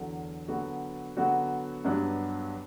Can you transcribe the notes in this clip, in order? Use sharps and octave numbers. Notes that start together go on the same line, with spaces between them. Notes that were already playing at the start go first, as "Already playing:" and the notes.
Already playing: E2 D3 F#3
D3 F#3 B3 F#4
D3 F#3 B3 F#4
G2 F#3 B3 D4